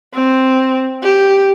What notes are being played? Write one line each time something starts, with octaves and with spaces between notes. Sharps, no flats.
C4
G4